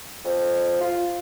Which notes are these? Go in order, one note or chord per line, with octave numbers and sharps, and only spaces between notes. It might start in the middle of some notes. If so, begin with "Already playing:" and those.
F2
F4